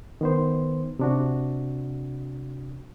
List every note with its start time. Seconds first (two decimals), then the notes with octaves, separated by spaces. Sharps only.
0.21 D#3 B3 C5
0.99 C3 D4 F#4